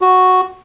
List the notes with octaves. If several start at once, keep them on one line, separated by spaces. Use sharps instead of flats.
F#4